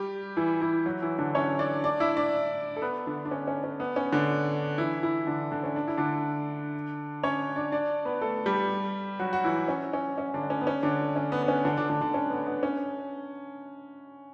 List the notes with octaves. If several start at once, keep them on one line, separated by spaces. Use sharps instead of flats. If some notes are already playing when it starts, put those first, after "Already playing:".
Already playing: G3 G4
E3 E4
E3 E4
F#3 F#4
E3 E4
D3 D4
C#4 C#5
D4 D5
D4 D5
E4 E5
D4 D5
A4
B3 B4
D3 D4
D4
C#4
C#4
C#4
B3
C#4
D3 D4
E3 E4
E3 E4
D3 D4
D3 D4
C#4
D4
E4
D3 D4
C#4 C#5
D4 D5
D4 D5
B3 B4
A3 A4
G3 G4
F#3 F#4
F#4
E3 E4
C#4
C#4
C#4
D3 D4
C#4
B3
C#4
D3 D4
C#4
B3
B3
C#4
D3 D4
D3 D4
D3 D4
D3 D4
C#4
B3
B3
C#4